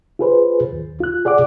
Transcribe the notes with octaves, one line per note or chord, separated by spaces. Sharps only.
F4 G#4 B4 C5
D#2
F4 F#6
G#4 D5 F#5 D6